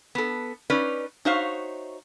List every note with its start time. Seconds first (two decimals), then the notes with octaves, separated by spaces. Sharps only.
0.15 B3 A4
0.70 C#4 D#4 B4 D5
1.25 D#4 F#4 C5 C#5 E5 F5